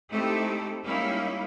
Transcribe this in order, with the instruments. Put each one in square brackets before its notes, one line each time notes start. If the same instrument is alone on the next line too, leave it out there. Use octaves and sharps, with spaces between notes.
[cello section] A3 C4 D#4 E4 G4 A4
G3 G#3 A#3 C#4 D#4 E4